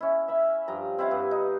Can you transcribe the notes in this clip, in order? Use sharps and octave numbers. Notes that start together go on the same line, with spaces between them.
C#4 E4
E5 B5
G2 F3 G5 A#5
C4 E4 F5 F#5
G2 B4
D#4